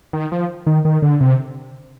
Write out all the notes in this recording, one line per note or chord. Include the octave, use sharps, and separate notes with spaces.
D#3
F3
D#3
D#3
D3
C3